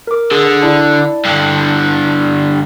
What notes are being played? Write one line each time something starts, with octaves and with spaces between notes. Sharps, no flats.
A#4 D6
D3 G#4 E6
E4 D5 A5
G2 D3